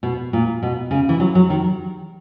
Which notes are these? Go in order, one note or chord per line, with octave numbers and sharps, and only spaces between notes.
B2
A#2
B2
C#3
E3
F#3
F#3
D#3